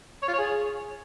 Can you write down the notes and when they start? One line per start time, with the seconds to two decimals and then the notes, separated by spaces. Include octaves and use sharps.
0.23 C#5
0.28 F4
0.33 C#5
0.38 G#4